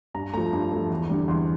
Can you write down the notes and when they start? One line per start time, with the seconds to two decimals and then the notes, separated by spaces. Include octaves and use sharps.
0.14 G2 A#5
0.33 F3 A3 A#5
0.53 G2
0.72 F3 A3
0.90 E2
1.09 D3 G3
1.28 E2 C6